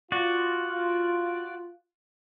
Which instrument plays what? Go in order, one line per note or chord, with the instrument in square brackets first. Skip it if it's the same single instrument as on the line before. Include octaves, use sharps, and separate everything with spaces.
[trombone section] F4 [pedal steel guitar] F#4 D5